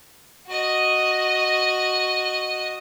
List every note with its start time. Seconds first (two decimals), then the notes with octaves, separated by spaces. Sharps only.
0.47 F#4 D#5